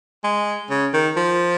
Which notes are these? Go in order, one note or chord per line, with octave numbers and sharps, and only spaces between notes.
G#3
C#3
D#3
F3